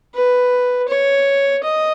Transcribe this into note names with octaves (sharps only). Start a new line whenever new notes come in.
B4
C#5
D#5